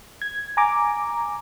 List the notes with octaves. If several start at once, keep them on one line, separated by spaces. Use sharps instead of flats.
G#6
G#5 A#5 D6